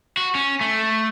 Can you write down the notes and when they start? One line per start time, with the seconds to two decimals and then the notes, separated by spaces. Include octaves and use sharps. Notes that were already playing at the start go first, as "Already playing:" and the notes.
0.17 F#4
0.35 C#4
0.61 A3